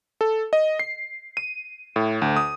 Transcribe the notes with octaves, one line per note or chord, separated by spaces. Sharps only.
A4
D#5
C7
D#7
A2
D2
D#6